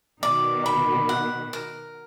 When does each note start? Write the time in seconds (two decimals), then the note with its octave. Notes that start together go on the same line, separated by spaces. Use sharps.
0.22 B2 D#3 D5
0.66 B5
1.09 F#5
1.53 A#4